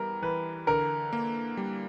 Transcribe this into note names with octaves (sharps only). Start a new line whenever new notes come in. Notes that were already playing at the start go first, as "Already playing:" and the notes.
Already playing: E3 G3 B3 A#4
E3 B4
D3 A#4
A#3
G3